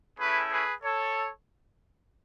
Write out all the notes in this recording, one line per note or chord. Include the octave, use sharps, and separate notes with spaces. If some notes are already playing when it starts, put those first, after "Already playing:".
A3 C#4 E4 G#4 B4
G#4 B4
A4 C#5